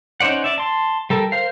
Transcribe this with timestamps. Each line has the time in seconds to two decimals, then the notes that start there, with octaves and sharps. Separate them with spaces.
0.20 C#4 D#4 C5 D5 F#5
0.44 D5 E5
0.58 A5 C6
1.10 G3 A4 A#4
1.32 A#4 C5 F5